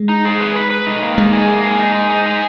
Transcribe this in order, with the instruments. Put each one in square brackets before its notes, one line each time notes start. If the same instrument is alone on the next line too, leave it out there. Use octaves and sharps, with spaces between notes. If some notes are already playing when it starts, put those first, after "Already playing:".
Already playing: [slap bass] G#3
[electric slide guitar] D#4
G#4
B4
B4
B4
D#4
A#3
[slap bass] G#3 [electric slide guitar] D#4
[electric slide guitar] G#4
A#3
G#4
D#4
G#4
D#4
G#4